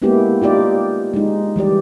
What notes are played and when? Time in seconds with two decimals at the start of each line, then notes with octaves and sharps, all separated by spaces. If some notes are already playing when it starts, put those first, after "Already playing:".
0.02 G#3 A#3 B3 C#4 E4 G4
0.42 D#4 F4 G4 D5
1.13 G#3 D#4
1.56 E3 G3 G4 D5